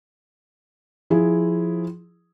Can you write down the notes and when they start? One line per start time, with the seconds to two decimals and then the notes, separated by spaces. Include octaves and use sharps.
1.10 F3 E4 G#4